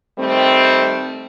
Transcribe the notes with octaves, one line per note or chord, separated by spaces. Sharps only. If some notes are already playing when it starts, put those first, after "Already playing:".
D#3 G3 A3 C4